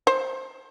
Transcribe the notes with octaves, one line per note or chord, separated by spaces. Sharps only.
C5